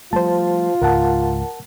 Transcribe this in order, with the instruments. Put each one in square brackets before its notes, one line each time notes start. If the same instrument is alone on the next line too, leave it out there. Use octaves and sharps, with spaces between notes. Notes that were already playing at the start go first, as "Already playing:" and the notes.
[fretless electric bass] F3 G3 A3 [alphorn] F4 [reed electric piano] C5 A5
[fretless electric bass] C#2 G#2 [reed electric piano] A#4 F#5 A5